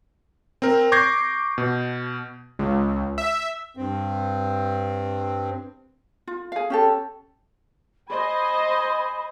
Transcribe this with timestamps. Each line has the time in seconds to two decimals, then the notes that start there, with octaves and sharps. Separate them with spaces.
0.62 C4 A#4
0.92 C#6 D6 G6 G#6 A#6 C7
1.58 B2
2.59 C#2
3.18 E5
3.77 G2 C4
6.28 F4
6.52 G#4 F5
6.70 C#4 G4 A4
8.08 C5 D#5 G#5 B5